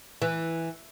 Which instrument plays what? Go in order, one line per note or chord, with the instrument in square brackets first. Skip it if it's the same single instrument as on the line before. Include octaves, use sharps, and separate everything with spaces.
[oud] E3